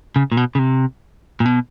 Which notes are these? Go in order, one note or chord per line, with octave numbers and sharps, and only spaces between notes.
C#3
A#2
B2
C#3
C3
A#2
B2